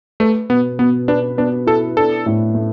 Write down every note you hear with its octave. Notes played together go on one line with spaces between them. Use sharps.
A3 B4
B2 B3
B2 B3
D4 B4
B3 D4
E4 A4
D4 A4
A2
A3